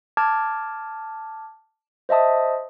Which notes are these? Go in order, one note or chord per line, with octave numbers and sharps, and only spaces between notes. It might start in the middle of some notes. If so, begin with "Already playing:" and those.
A5 D6 F6 G#6
C5 D#5 E5 A5 D#6